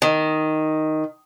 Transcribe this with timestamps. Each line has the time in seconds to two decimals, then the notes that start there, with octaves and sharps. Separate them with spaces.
0.02 D#3